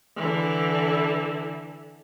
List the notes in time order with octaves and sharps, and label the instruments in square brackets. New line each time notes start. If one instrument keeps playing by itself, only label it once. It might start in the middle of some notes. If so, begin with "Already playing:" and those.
[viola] D3 E3